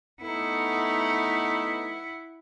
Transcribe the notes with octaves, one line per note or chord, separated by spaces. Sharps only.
A3 B3 D#4 E4 F#5